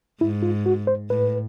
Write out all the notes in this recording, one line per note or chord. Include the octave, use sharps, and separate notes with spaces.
G#2 E4
F4
F#4
C5
A2 B4